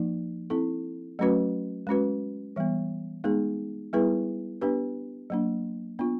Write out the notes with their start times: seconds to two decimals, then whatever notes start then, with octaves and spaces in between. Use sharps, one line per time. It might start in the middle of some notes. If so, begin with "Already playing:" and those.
Already playing: F3 A#3 D#4
0.50 C4 E4 A4
1.19 F#3 A3 C#4 F#4 B4
1.87 G#3 C#4 F#4 B4
2.56 E3 G3 B3
3.24 G#3 B3 D#4 G#4
3.93 G3 B3 E4 G#4 B4
4.61 B3 D4 G4 B4
5.30 F#3 A#3 D4
5.99 B3 D4 F4